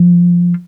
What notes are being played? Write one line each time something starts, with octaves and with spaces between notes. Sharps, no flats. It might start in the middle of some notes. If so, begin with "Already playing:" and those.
Already playing: F3